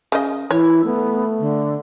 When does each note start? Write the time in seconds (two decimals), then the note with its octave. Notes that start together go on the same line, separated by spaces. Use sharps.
0.12 C#3 D#5
0.51 E3 E4 C#5
0.85 A3 B3
1.39 D3